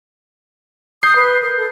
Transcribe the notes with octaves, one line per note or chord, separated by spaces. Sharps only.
D#6 G6 C7
B4
A#4
A4